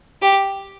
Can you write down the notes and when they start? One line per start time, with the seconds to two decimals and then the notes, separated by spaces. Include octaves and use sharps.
0.21 G4